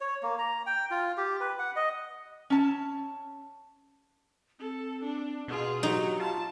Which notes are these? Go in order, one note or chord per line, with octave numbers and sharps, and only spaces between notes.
C#5
A#3
A#5
G5
F4
G4
B4
F#5
D#5
C#4 A5
C4 A4
D4
B2 F4 G#4 F#5
F#3 D#4 G4
F4 A5